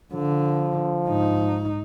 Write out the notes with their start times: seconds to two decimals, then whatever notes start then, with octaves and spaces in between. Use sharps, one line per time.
0.14 D3 F3
1.07 G#2 D#4